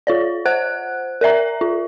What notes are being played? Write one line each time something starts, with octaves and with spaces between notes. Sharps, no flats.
F4 C#5 D5
C5 F#5 F#6
A#4 D5 E5 A#5
F4